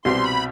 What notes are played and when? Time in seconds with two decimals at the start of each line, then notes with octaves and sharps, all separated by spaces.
0.04 C2 B2 G3 C4 C6
0.24 B5